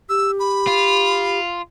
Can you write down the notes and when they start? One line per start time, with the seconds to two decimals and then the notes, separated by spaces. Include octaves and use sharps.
0.09 G4 E6
0.40 B5
0.67 F4